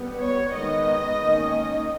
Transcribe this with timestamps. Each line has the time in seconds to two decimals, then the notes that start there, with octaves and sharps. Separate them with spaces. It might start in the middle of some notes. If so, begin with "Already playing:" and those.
Already playing: G3 B3
0.20 C#5
0.53 D#3 G#3 B3 D#5
1.20 D#3 A#3 C#4